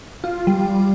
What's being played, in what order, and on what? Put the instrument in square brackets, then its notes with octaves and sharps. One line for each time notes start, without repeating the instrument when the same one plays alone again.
[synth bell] F4
G3